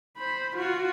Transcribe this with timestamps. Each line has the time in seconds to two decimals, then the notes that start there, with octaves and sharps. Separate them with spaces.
0.18 C5 B5
0.56 F4 F#4